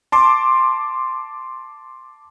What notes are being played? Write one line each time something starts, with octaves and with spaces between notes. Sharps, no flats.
A5 C6 D6